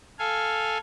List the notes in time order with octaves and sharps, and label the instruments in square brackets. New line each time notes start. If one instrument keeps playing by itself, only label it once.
[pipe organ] A4 F5 G#5